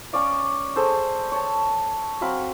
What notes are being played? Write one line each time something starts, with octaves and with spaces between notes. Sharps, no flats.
C#4 C#5 D5 F5
G#4 A4 C5
C#5 A5
F#3 C4 F5 B5